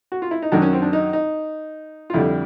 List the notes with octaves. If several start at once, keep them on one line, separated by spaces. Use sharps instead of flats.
F#4
F4
E4
D#4
F#2 D#3 F#3 D4
C#4
C4
D4
D#4
D#4
F4
F2 D3 G3 E4